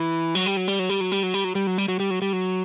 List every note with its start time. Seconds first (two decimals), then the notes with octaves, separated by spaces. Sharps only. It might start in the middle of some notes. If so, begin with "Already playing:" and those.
Already playing: E3
0.35 F#3
0.46 G3
0.57 F#3
0.68 G3
0.79 F#3
0.89 G3
1.01 F#3
1.12 G3
1.23 F#3
1.34 G3
1.44 F#3
1.55 G3
1.67 F#3
1.78 G3
1.88 F#3
2.00 G3
2.11 F#3
2.22 G3
2.33 F#3